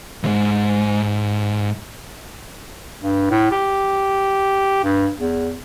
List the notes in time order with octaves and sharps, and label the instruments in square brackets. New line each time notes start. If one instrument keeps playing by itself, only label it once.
[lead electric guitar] C#2 G#2
[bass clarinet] G2
A2
G4
G2
E2